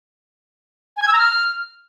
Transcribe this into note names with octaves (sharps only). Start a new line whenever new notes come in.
G#5
G#6
E6
A#5
F6